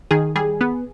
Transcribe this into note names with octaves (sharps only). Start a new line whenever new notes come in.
D#3 G#4
G3 G#4
B3